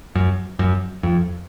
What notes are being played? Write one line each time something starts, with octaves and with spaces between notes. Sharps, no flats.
F#2
F#2
F2